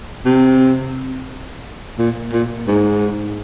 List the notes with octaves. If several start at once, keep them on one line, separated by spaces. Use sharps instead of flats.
C3
A#2
A#2
G#2